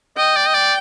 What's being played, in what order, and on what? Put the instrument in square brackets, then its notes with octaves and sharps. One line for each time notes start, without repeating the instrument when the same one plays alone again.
[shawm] D#5 [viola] G5
[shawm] D5
D#5
D5